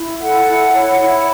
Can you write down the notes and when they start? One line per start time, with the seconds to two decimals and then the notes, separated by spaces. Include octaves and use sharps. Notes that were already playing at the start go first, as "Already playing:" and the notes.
Already playing: E4
0.20 A4 F#5
0.46 E4
0.73 C#5
0.99 E4